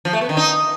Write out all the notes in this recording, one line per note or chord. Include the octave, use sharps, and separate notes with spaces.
F3
A3
B3
D#3
D#4